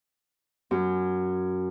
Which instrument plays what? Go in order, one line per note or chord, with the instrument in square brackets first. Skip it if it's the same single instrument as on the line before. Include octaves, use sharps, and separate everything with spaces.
[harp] F#2